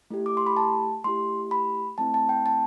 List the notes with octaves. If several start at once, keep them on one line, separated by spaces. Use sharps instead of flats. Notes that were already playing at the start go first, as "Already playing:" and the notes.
A3 E4 G4
D6
C6
B5
A5
A3 E4 G4 C6
B5
A3 C4 E4 A5
A5
G5
A5